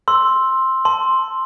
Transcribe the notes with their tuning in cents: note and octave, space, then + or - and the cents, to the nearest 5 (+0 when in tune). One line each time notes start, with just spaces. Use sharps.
C6 +5 E6 +0
A5 +10 C6 +0